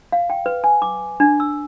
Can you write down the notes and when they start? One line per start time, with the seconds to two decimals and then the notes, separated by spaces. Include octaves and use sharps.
0.12 F5
0.30 G5
0.46 B4
0.64 G#5
0.82 D6
1.20 D4
1.40 E6